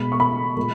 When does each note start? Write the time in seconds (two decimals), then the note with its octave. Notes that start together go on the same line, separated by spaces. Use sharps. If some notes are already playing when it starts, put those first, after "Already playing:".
Already playing: B2 G#3 B5
0.12 C#6
0.20 B5
0.57 A#2 G#3